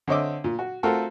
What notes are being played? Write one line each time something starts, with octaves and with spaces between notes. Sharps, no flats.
D3 C4 C#5 D#5 E5 D6
A#2
F#4
A3 C4 F4 F#4 A4 A#4